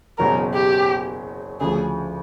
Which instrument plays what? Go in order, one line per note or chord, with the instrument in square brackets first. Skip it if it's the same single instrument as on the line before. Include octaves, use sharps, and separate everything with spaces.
[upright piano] F#1 E2 B2 F#3 [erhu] A#4
[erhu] G4
[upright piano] D2 C#3 F3 [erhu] G#4